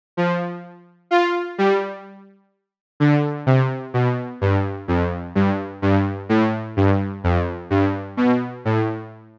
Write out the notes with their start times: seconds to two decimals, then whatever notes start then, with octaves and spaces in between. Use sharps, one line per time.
0.17 F3
1.11 F4
1.58 G3
3.00 D3
3.46 C3
3.94 B2
4.41 G2
4.88 F2
5.35 G2
5.82 G2
6.29 A2
6.77 G2
7.24 F2
7.70 G2
8.17 B2
8.65 A2